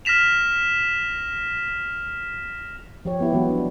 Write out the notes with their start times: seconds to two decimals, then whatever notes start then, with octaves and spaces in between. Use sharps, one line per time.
0.05 F6 A#6 B6 E7 F7
3.05 F3 G4 C#5
3.20 B3 E4 G4
3.33 E3 F#3 G#3 B3 F#4
3.50 D4